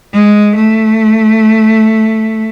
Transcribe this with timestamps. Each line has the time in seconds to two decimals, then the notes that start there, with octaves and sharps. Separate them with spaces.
0.13 G#3
0.55 A3